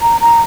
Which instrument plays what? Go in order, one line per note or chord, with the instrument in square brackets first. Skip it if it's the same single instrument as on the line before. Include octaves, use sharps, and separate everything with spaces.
[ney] A#5
A#5